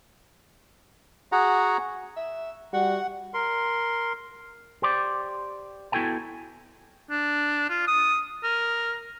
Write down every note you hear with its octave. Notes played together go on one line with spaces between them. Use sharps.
F#4 G#4 F#5 A#5
E5
G3 F#4 F#5
A#4 C6
G4 C5 D5
B3 E4 F#4 A4 G5 G#5
D4
F4
D#6
A#4